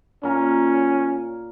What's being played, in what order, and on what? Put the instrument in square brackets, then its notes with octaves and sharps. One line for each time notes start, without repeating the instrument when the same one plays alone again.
[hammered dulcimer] A#2 A#4 A#5 [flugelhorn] C#4